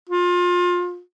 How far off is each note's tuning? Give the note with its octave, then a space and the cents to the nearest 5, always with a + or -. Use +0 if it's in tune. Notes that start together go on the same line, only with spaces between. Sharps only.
F4 +25